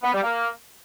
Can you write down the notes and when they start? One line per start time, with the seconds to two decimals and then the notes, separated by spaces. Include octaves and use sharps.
0.03 B3
0.13 G3
0.23 A#3